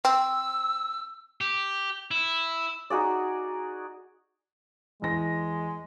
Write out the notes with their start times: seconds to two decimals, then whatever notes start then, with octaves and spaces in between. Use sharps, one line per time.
0.05 C4 E6
1.41 G4
2.11 E4
2.90 D#4 F#4 G#4 D5
5.02 E2 G#3 A#6